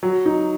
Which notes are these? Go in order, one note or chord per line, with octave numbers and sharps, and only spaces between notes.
F#3
D#4